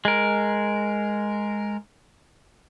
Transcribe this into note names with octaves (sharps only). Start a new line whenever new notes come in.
G#3 A#4